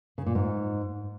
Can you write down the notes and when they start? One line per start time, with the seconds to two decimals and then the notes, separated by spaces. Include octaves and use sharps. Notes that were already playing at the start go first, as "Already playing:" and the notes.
0.18 C#3
0.26 A#2
0.35 G#2